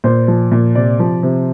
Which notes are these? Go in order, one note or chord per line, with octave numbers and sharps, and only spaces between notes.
A#2 C5
F3
A#2
C3 D5
F3
C3